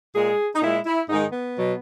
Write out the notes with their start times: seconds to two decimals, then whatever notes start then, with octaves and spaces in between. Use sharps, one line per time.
0.15 A#2 G#3 G#4
0.56 D#4
0.62 A#2 G#3 E4
0.86 E4
1.09 G#2 D#3 G#3 D#4
1.33 B3
1.57 B2 F#3